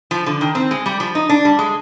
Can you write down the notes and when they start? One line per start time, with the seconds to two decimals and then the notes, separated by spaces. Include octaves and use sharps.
0.11 F3
0.26 D3
0.41 D#3
0.55 C4
0.71 G#3
0.86 G3
1.00 F3
1.15 D#4
1.29 D4
1.45 G3
1.59 G#3